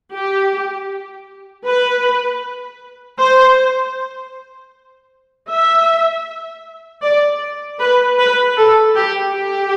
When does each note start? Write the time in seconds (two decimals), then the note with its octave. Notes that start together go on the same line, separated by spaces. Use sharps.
0.12 G4
1.66 B4
3.19 C5
5.49 E5
7.03 D5
7.79 B4
8.18 B4
8.57 A4
8.95 G4
9.33 G4